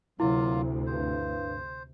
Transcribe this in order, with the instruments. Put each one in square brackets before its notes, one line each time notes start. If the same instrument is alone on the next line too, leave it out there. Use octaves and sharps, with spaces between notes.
[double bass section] D2 C3 [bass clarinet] F#3 [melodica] A#3 F4 [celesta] E4
[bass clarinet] G2 [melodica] C5